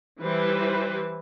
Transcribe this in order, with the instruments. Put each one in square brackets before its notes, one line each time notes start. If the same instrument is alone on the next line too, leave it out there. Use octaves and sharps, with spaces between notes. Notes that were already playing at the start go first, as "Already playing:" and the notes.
[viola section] E3 G3 B4 C5